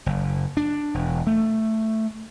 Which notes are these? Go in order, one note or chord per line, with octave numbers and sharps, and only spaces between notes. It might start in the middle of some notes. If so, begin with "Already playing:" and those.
F#1
D4
E1
A3